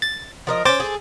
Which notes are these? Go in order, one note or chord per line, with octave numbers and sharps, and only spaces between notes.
A6
F3 A#4 D#5
C4 C#4 C5 D6 A6
G#4 A4